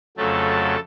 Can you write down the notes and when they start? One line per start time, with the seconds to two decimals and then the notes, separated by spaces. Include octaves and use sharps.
0.17 F2 C#3 F#3 A3 A4